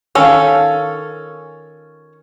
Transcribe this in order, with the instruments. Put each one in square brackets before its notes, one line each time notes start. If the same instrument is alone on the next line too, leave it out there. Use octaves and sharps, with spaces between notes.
[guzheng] D#3 F4 [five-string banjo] C#4 A4